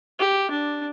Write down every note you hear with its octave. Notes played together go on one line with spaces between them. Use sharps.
G4
D4